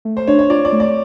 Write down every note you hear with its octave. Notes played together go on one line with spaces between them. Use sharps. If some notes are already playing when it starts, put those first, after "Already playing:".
A3
C5
D4 C#5
C#5
F4 D5
D5
A3
D5